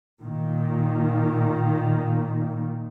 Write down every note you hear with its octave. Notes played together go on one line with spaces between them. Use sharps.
A#2 D#3